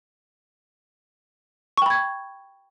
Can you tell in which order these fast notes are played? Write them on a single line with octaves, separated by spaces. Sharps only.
C#6 G5 B5 G#6